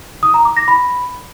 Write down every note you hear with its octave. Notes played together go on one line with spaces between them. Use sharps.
D#6
A#5
D6
A#6
B5